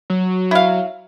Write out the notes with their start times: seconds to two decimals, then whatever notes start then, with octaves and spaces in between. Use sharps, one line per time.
0.10 F#3
0.51 E4 F5